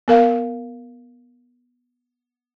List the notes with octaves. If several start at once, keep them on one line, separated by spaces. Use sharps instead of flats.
B3 A#4 F5